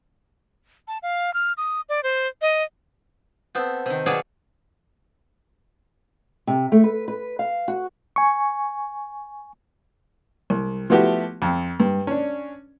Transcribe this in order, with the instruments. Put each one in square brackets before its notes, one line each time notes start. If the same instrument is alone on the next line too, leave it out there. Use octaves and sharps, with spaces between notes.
[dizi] A5
F5
F6
D#6
D5
C5
D#5
[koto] B3 C4 A4
C3 D#3
B2 F#3 G#4 C#5 D5 F5
[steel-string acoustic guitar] C3
A3
B4
B4
F5
F#4
[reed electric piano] G#5 C#6
[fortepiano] C2
F3 A3 B3 E4 F#4 G4
F2 C4
G2
C#4 D4